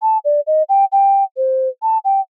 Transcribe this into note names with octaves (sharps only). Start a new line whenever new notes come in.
A5
D5
D#5
G5
G5
C5
A5
G5